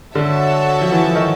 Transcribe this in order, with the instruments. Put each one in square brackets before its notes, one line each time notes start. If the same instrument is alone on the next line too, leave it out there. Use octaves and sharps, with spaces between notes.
[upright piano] D3 [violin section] F#4 A4 C#5 E5 A5
[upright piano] F3
E3
F3
D#3